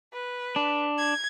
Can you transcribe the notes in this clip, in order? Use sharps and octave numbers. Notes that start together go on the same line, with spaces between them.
B4
D4
G#6